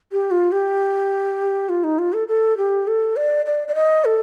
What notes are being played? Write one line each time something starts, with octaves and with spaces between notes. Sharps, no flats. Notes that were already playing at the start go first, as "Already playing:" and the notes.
G4
F4
G4
F4
D#4
F4
A4
A4
G4
A4
D5
D5
D5
D#5
A4